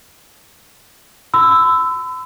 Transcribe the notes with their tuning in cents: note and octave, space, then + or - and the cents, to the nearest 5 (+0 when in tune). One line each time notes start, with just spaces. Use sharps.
B5 +45 E6 +0